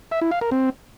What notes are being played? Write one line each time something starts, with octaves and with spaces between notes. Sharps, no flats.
E5
E4
F5
A#4
C4